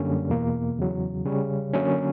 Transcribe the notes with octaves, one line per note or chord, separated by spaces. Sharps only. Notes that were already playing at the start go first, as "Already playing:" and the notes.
Already playing: F#2 D3 G3 A#3 C#4
E2 B2 A#3
E2 C#3 F#3
C#3 G3 C#4
D3 F#3 A#3 C#4